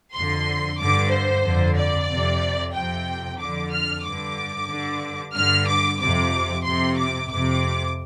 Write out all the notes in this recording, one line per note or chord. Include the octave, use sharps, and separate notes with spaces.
F2 D3 C6
G2 D3 D6
C5
F2 D3
D5
F2 C3
F2 C3 G5
F2 D3 D6
F6
G2 D3 D6
G2 D3
G2 D3 F6
D6
F2 C3 D6
F2 C3 C6
D6
F2 C3 D6